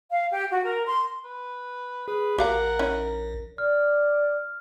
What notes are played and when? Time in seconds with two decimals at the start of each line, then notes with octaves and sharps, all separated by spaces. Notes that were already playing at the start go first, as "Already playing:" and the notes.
0.11 F5
0.31 G4
0.51 F#4
0.65 A#4
0.87 C6
1.24 B4
2.08 G#4 B4
2.38 A#1 G4 A#4 F5 F#5 A#5
2.79 C#4 D#4 E4
3.58 D5 F6